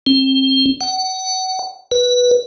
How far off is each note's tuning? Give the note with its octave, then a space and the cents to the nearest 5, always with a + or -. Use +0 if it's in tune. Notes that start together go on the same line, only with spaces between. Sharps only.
C4 +30
F#5 +30
B4 -10